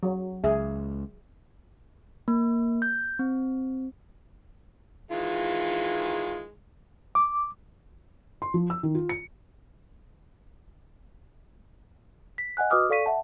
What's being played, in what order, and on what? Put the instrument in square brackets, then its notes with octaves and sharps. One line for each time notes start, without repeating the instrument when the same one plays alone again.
[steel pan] F#3
[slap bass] C#2 [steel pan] G#4 [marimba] E5
[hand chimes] A#3
G6
C4
[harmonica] D#3 E3 G#3 [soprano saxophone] F4
[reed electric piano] D6
[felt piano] C6
F3
E6
D#3
F4
C#7
[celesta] B6
D#5 F#5 G#5 F#6
F#4 B4 D#5 D6 D#6 F6
A4 D5 F5 C#6 B6 D#7
E5 F#5 A5